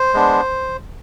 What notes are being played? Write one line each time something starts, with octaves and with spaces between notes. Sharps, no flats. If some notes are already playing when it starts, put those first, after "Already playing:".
Already playing: C5
G#3 B3 D4